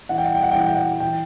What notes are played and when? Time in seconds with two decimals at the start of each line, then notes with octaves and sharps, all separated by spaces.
0.09 E3 F#5
0.18 G5
0.26 F#5
0.35 G5
0.43 F#5
0.51 G5
0.55 E3 F#5
0.67 G5
0.75 F#5
1.00 E3 G5